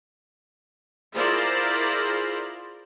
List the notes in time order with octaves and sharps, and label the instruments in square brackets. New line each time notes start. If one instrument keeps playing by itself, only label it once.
[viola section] E4 F4 G#4 A#4 C5 D5